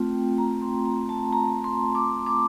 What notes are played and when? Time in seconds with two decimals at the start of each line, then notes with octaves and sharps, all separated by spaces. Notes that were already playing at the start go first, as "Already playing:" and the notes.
Already playing: A3 C4 F4 G5
0.38 A#5
0.62 C6
0.86 A#5
1.09 A5
1.33 A#5
1.64 C6
1.95 D6
2.26 D6